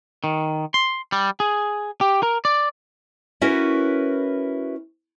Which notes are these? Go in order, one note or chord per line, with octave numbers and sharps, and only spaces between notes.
D#3
C6
G3
G#4
G4
A#4
D5
C#4 E4 F#4 A#4 B4